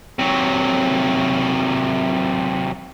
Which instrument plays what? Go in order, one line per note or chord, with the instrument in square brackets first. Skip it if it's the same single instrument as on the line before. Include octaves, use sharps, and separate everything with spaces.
[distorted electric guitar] C3 F#3